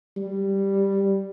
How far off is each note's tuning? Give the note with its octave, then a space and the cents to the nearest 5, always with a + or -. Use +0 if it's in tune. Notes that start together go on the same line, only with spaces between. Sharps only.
G3 +0